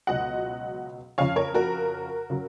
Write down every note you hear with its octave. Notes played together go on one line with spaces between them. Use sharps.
C#2 B2 F#3 D#5 F#5
F2 C#3 F3 C#5 F5
A#4 C#5
F#4 A#4
C#3 F#3